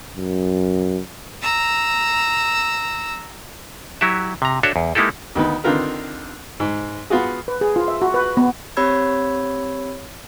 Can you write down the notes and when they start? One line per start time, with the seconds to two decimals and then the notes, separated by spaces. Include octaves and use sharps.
0.17 F#2
1.42 A#5 E6
4.01 F#3 E4 F#4 G4 E5
4.42 C3 A#5
4.63 D4 F#4 A4 C#5 E5
4.76 E2
4.95 G#3 A#3 D#4 E4 G4 A4
5.35 D2 D#3 B3
5.64 D3 D#3 C4 F4 A#4 B4
6.60 G#2
7.10 B3 F4 F#4 G#4
7.48 B4
7.61 G#4
7.76 F4
7.88 E5
8.02 F#4
8.14 B4
8.37 B3
8.77 C4 G4 C#5 B5 E6 G#6